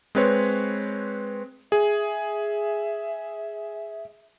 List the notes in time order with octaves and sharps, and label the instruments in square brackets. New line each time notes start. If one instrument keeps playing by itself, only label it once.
[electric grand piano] G#3 C4 B4 C#5
[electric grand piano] G#4 [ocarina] E5